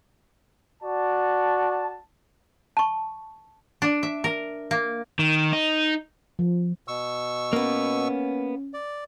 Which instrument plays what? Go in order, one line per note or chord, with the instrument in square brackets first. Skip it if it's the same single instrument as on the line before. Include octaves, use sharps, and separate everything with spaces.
[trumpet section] F#4 D5 A5
[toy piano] A5 C#6
[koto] D4
E5
A#4
A#3
[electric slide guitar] D#3
D#4
[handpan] F3
[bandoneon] B2 C#6 E6
[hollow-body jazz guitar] A#3 B3 [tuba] C#4
[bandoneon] D5